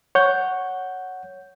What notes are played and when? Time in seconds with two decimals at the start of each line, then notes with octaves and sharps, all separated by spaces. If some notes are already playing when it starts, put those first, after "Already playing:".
0.15 C#5 F#5 G6